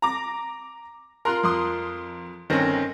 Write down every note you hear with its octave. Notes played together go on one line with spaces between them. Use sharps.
A#5 D6 A#6
F4 A#4 A#5 C6 F#6
F2 C6 D#6
G1 D#3 C4 C#4 C5 A#6